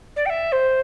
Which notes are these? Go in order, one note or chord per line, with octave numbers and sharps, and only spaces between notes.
D5
G5
E5
C5